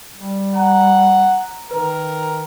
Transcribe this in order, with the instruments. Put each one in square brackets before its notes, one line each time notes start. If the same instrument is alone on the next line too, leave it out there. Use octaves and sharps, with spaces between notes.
[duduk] G3
[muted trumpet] F#5 [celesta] A#5
[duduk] D#3 [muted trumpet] A#4 [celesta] B4